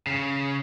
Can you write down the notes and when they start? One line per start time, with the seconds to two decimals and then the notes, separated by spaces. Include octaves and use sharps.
0.07 C#3